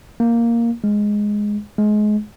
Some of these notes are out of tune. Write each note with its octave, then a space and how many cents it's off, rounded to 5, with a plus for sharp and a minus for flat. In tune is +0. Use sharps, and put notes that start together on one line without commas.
A#3 +0
G#3 +0
G#3 +25